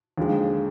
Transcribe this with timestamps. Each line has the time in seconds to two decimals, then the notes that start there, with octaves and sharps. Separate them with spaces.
0.18 D#2 D3 F3 G#3